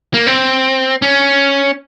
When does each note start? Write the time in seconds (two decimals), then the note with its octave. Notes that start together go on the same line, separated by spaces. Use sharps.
0.14 A#3
0.27 C4
1.02 C#4